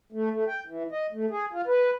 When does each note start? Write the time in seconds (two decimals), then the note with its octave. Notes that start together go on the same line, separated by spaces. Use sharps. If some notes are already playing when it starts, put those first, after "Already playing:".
0.12 A3
0.31 A3
0.48 G5
0.67 E3
0.92 D#5
1.12 A3
1.30 G#4
1.52 F4
1.67 B4